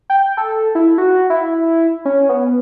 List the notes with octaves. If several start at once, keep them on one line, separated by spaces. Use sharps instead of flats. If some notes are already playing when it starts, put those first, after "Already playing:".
G5
A4
E4
F#4
E4
C#4
B3